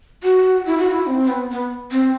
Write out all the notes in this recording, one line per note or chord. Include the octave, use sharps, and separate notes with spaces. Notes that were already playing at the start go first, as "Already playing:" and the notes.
F#4
E4
F#4
E4
C4
B3
B3
C4